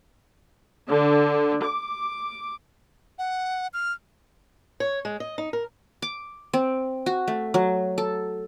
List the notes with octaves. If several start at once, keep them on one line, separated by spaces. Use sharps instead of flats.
D3
D6
F#5
F6
C#5
G#3
D#5
D#4
A#4
D6
C4
F#4
A3
F#3
A4